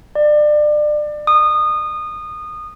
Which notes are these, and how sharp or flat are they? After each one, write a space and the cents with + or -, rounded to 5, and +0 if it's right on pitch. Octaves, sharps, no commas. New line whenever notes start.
D5 +30
D#6 -25